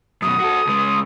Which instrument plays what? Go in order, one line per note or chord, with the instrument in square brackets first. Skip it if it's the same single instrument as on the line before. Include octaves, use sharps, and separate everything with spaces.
[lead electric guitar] F#2 B2 [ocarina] D#6
[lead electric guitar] F#4 A4
C#2 G#3